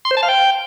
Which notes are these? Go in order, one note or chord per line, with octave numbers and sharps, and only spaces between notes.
C6
C5
A5
F5
G5